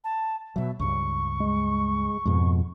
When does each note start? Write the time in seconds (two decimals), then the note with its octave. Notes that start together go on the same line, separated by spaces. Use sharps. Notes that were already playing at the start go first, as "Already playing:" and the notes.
0.04 A5
0.56 B2 F#3 E5
0.79 C#2 G2 C#6
1.40 G#3
2.26 F2 G#2 B2 G#3